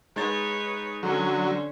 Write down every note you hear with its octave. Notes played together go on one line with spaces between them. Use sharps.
G#3 D#4 B4 C#5 A6
D3 F#3 C#4 C5